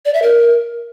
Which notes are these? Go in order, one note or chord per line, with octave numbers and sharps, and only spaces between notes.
D5
E5
A#4